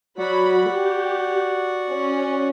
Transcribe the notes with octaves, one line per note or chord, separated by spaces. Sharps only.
F#3 F#4 D5 F#5 B5
G4
C#4